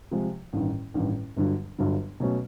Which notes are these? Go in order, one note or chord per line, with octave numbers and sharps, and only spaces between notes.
C3 F3 G#3
A1 G2 D#3
A1 G2 D#3
G1 G2 D3 F#3
G1 G2 D3 F#3
B2 F#3 A3 C#4